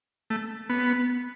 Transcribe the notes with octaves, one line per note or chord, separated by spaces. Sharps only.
A3
B3